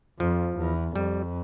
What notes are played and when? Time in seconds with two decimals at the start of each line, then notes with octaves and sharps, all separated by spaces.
0.19 F2 F3
0.57 E2
0.95 F2 G3